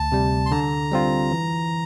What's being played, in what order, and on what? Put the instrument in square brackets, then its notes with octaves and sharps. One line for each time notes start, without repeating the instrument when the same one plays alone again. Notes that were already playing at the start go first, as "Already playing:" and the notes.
Already playing: [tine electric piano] D2 [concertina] A5
[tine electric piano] C3 G3
[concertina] C6
[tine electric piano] D3 [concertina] A#5
[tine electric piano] G3 C4 F4
E3